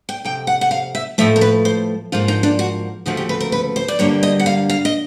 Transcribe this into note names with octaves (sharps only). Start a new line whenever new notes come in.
G5
F2 C3 G5
F#5
F#5
F5
E5
A2 F3 A3 E5
A#4
B4
C5
G#2 F3 A#3 F4
D#4
D4
F#4
D2 C#3 F3 A3 F#4
G4
B4
A#4
B4
C5
D5
G2 D3 G3 A#3 C#5
D#5
F#5
F5
F5
D#5